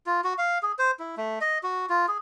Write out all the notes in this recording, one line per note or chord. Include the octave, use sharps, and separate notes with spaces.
F4
F#4
F5
G#4
C5
E4
A3
D#5
F#4
F4
G#4